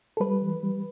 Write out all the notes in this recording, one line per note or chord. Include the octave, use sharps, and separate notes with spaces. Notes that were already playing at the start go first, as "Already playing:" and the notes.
A4
G3 B4
E3
G3